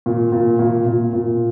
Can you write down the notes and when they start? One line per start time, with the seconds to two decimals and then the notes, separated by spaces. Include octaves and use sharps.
0.06 A#2
0.32 A#2
0.59 A#2
0.86 A#2
1.13 A#2